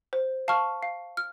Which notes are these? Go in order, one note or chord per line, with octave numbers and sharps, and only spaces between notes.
C5
F5 A5 C#6 F6
F5
F6